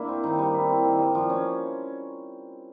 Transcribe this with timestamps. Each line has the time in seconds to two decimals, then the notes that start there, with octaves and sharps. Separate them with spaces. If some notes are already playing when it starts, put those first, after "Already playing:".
Already playing: A#3 D4 E4
0.09 C4
0.24 D#3
0.39 G3
0.54 E4
0.69 C4
0.84 D#3
0.99 G3
1.15 F3
1.30 C#4